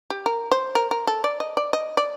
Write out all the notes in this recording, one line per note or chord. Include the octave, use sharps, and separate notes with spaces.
G4
A#4
C5
A#4
A#4
A4
D5
D#5
D5
D#5
D5